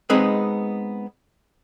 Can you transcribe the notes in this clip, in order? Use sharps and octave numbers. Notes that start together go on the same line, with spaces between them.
G#3 B3 C4 D#4 G#4 B4